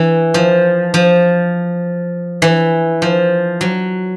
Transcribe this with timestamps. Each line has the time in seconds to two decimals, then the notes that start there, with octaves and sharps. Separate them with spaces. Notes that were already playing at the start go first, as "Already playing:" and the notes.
Already playing: E3
0.34 F3
0.94 F3
2.42 E3
3.02 F3
3.61 F#3